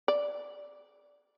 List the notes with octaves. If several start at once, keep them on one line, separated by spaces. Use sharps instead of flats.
D5